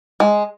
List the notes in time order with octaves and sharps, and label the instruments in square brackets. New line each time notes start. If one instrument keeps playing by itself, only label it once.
[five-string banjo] G#3